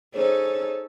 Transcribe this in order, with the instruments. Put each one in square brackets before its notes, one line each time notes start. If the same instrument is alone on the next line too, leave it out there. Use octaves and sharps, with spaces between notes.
[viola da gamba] C#4 D#4 A4 [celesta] G#4 C5 C#5